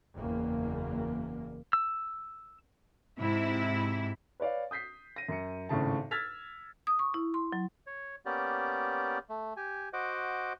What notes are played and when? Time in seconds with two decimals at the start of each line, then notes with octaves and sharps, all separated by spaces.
0.15 F#1 E2 A#3
1.73 E6
3.17 G#2 C3 E4
4.40 B4 C#5 D5 F5
4.71 D#6 G6 B6 C7
5.16 A#6 D#7
5.29 F#2 C#7
5.69 G#1 A2 C#3 A5
6.11 E6 F6 G#6 A6 B6 F7
6.87 D#6
6.99 C#6
7.14 E4
7.34 C6
7.53 F#3
7.87 C#5
8.26 A#3 B3 C#4 G4 D5
9.30 A3
9.57 G4 G#5
9.93 F#4 C5 D#5 F#5 D6